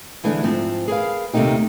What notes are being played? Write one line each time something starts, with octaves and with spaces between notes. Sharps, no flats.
D3 E3 G#3 A3 D4
G#2 F3 C4
G#4 A#4 B4 F5
D#2 C3 A3 A#3 D#4 G4